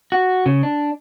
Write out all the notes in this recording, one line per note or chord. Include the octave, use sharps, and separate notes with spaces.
F#4
C#3
D4